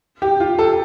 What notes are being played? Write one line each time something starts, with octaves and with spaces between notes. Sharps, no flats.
G4
F4
A4